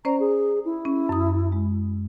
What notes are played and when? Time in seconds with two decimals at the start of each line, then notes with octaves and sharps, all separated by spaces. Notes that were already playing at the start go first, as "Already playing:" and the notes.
0.05 C#4 C5 D5 A#5
0.20 G#4
0.65 E4
0.85 C#4
1.09 F#2 D#6
1.52 G#3